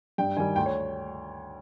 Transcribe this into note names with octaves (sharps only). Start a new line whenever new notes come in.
G2 G5
D#3 G3 G#5
D2 G5
C#5